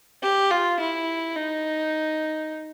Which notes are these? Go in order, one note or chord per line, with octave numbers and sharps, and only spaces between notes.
G4
F4
E4
D#4